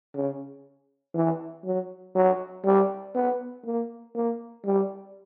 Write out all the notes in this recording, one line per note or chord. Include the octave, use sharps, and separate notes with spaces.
C#3
E3
F#3
F#3
G3
B3
A#3
A#3
G3